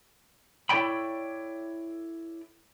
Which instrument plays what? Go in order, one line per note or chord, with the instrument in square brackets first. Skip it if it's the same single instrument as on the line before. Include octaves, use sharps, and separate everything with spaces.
[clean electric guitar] E4 A4 C#5 D5 G5 B5